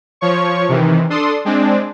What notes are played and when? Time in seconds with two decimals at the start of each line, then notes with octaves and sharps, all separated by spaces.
0.21 F3 C#5 C#6
0.69 C3 D#3 E3
1.10 D4 A4 C6 D#6
1.45 G#3 C4 D4